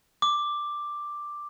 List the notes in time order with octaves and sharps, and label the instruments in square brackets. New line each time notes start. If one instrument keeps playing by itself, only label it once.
[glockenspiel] D6